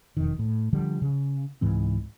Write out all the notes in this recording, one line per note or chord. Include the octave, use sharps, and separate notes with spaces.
E1 F2 D#3
A2
D3 F3 G3
C#3
C#2 G#2 E3 C4